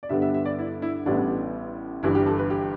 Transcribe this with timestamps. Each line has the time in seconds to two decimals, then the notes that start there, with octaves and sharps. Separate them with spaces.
0.03 D5
0.09 G2 D3 G3 B3 E5
0.22 E5
0.34 E5
0.45 D5
0.59 E4
0.82 E4
1.06 A1 A2 G3 B3 D4
2.03 G1 G2 E3 G3 E4
2.15 G4
2.26 A4
2.38 B4
2.50 G4